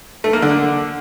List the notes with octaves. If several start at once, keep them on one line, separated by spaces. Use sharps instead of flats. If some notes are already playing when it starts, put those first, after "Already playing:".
A3
A#3
D3